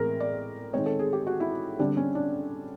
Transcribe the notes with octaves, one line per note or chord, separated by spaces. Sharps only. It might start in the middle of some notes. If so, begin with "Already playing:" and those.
Already playing: A2 E3 G#3 C4 G#4 A#4
D5
D#3 G#3 C4 C#5
A4
G#4
G4
F#4
E4
D3 G3 C4 D4
C#4
D4